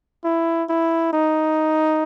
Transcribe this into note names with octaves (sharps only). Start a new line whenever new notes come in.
E4
E4
D#4